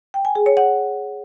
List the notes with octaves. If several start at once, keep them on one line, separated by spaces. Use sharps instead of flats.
G5
G#5
G#4
C#5
F#5